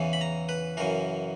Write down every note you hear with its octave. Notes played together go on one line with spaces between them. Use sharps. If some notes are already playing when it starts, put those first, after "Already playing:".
Already playing: E2 C#3 E3
B5
A#5
B4
F#2 C#3 E3 A#4